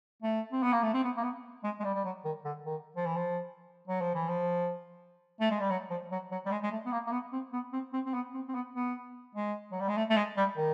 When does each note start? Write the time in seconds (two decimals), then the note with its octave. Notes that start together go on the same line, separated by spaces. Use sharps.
0.22 A3
0.52 C4
0.63 B3
0.73 A#3
0.83 A3
0.94 C4
1.04 B3
1.17 A#3
1.24 B3
1.64 G#3
1.80 G#3
1.85 G3
1.95 G3
2.05 F#3
2.25 D#3
2.45 D3
2.66 D#3
2.96 F3
3.06 E3
3.16 F3
3.88 F#3
4.01 F3
4.15 E3
4.28 F3
5.41 A3
5.51 G#3
5.60 G3
5.70 F#3
5.90 F3
6.12 F#3
6.31 F#3
6.46 G3
6.51 G#3
6.63 G#3
6.72 A3
6.86 B3
6.92 A#3
7.07 A#3
7.12 B3
7.33 C4
7.53 B3
7.73 C4
7.93 C4
8.06 C4
8.14 B3
8.34 C4
8.49 C4
8.54 B3
8.75 B3
9.35 G#3
9.72 F#3
9.80 G3
9.88 G#3
9.97 A3
10.10 A3
10.17 G#3
10.37 G3
10.57 D#3